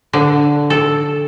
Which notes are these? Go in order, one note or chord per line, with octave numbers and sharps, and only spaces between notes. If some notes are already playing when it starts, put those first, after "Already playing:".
D3
A4